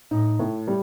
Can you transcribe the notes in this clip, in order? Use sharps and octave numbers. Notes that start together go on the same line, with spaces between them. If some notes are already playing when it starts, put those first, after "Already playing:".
A2 D#4
A2
G3